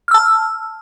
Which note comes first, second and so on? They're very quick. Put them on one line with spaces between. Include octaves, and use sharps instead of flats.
F6 E6 A5